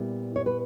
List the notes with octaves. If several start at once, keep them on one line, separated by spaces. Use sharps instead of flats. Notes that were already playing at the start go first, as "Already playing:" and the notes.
Already playing: A#2 G3 B3 E4
C#5
B4